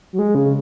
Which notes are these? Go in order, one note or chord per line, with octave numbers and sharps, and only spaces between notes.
F#3
G#3
C#3